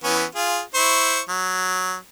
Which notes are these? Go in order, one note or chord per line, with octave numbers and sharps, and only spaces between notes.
E3 B3 C#4
F4 G#4
E4 C5 C#6
F#3